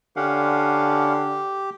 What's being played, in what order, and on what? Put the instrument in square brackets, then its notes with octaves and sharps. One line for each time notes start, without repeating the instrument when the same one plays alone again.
[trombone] D3 [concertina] C#4 F5 F#5 [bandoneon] G4